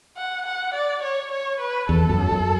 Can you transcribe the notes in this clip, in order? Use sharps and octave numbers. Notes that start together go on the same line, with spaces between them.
F#5
F#5
D5
C#5
C#5
B4
E2 A4
F#2
F#2